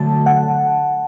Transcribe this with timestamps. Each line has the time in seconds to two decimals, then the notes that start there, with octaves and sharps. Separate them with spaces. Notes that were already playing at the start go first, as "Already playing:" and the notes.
Already playing: D3 F#3 A3 A5
0.26 F#5